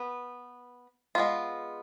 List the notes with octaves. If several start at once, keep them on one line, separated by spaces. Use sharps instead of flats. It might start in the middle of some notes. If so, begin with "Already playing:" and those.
Already playing: B3 B4
G#3 B3 F4